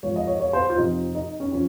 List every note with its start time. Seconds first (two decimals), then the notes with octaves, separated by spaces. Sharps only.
0.03 G#2 F3 C#5
0.16 D#5
0.27 C#5
0.40 C#5
0.53 C5
0.70 F4
0.77 F2 C3 F3 D#4
1.15 D#4
1.40 C#4
1.52 F3 C#4